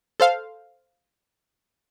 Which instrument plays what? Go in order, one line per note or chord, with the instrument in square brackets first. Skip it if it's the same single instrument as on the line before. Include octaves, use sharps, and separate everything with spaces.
[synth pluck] A4 C5 F5